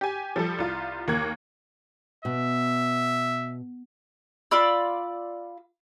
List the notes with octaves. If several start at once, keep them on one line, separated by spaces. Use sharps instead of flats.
G4 G#5
F3 G3 A4
C2 F4
D#2 A#3 F#6 G#6
B2 E5
F4 D5 B5 E6